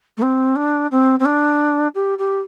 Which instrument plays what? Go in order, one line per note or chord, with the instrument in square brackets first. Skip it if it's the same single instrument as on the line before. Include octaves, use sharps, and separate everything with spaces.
[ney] A3
C4
D4
C4
C4
D4
G4
G4